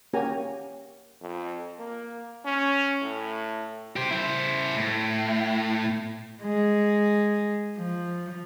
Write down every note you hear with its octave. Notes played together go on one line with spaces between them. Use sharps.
A#3 C#4 F#4 G4 G#5 A#5
F2
A#3
C#4
A2
G4 C5
E4 C5
A2
G#3
F3